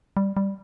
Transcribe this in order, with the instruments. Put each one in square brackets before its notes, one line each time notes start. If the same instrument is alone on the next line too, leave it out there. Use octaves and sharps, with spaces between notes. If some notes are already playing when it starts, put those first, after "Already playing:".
[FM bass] G3
G3